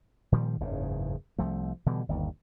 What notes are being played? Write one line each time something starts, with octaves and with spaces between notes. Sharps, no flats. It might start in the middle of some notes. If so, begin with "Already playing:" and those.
A#2 D#3 F3 G3
F#1 E2 G#2 C#3
C2 F3 A3
B2 D3 E3 G3
G1 D#2